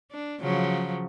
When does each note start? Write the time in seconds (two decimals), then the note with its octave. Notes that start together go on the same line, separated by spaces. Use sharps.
0.12 D4
0.41 C#3 F3 F#3